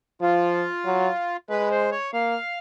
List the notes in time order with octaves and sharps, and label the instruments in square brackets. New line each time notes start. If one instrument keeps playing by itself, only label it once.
[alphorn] F3 [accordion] F4
[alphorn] F#3
[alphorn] G#3 [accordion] B4
[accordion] C5
C#5
[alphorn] A#3 [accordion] F5